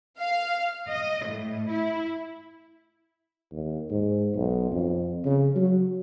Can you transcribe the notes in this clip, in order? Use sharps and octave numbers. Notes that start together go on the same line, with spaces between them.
F5
D#5
A2
E4
D#2
G#2
B1
F2
C#3
F#3